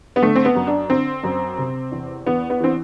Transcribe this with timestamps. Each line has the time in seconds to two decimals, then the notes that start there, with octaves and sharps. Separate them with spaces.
0.16 B3
0.22 D3 A3
0.35 C4
0.45 B3
0.55 F#2
0.67 D4
0.90 D3 C4
1.24 F#2
1.58 C3
1.92 E2
2.26 E2 B3
2.50 B3
2.60 E3 C4